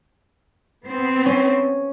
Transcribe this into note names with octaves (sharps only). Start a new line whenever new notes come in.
B3 C4
C#4